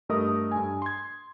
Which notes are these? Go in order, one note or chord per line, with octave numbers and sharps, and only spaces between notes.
G2 A3 A#4 D#5 D#6
G2 G#5
C6 G#6